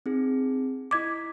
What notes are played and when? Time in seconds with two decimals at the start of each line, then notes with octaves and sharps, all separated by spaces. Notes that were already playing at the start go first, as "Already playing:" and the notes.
0.06 C4 D#4 G#4
0.91 E4 D#5 D6 G#6 B6